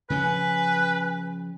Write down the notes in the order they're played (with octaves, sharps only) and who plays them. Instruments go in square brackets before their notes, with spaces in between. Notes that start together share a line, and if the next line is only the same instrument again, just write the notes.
[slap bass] C#3 F3 C#4 [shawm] B4 [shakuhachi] G#5